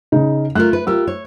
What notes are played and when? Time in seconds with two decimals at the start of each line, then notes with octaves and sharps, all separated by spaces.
0.12 C#3 D#4
0.55 A3 F4 A#4 F#6
0.73 B4
0.87 F4 G4 A#4 E6
1.07 C#5